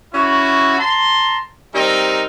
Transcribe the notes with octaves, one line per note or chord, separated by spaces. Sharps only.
C#4 E4 F#4
A5 A#5 C6
G3 C4 D#4 A#4